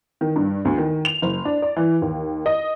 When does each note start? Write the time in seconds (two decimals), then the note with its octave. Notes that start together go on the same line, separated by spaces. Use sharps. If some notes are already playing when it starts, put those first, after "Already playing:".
0.21 D#3
0.36 G2
0.65 D2
0.78 D#3
1.05 F7
1.22 F#1
1.45 D4
1.62 D5
1.76 E3
2.02 D#2
2.46 D#5